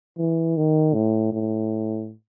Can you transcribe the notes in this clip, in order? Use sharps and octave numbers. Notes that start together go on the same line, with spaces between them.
E3
D#3
A2
A2